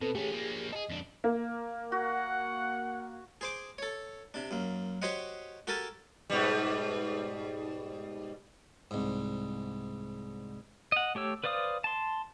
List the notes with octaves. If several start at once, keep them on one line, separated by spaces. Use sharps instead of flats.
B2 C4 A4 B4
A3 C#4 G4 G#4
F3 A#3
G#4 A4 D#5
F2 D4
A#3
F#4 F#5
G#4 C5 D6
A4 C#5
C3 D4
F#2 A#3
F#4 G4 C5 C#5 D#5 F#5
F#4 G4 A4 A#4 G#5 A5
G#2 B2 G3
C2 G#2
D#5 F#5
A3 G4 C#5 E6
B4 C5 D5 F5 D#6
A5 C6